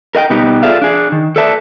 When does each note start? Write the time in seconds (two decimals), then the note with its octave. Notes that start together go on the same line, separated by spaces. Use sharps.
0.15 A#4 D#5 F#5 G5
0.30 B2 G3 B3 D#4 G4
0.63 F4 G#4 A4 D5 E5 F5
0.82 D4 G#4
1.12 D#3
1.36 A4 B4 D5 E5 A5